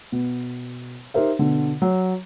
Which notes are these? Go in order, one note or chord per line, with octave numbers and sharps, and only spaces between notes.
B2
D#4 G4 A#4 C5 E5
B2 D3
F#3